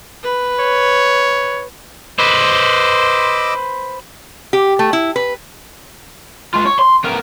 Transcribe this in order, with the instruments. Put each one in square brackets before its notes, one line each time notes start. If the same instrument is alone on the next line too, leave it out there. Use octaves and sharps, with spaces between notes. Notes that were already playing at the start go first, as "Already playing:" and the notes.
[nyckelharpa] B4
[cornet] C#5
[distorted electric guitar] B4 C5 [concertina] D#5 D6 E6
[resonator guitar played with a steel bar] G4
A3
E4
B4
[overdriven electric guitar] G#3 F4
C#5
C6
B3 A#4